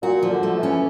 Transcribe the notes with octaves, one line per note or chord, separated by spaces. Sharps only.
A#2 F#4
F3
D3
A3
E3
C#4